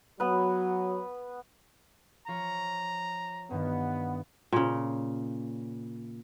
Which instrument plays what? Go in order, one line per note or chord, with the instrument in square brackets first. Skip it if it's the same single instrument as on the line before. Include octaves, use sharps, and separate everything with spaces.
[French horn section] F#3 F#4 [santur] B3 B4
[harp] F3 F4 C#5 [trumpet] A#5
[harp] G2 D#3 [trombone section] B3
[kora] A#2 C#3